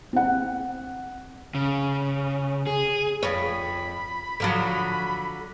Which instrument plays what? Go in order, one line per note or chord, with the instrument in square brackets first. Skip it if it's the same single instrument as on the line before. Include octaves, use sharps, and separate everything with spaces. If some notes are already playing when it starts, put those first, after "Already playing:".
[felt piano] C4 F#5
[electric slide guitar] C#3
G#4
[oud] F2 C#5 [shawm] B5
[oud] D3 F3 F#3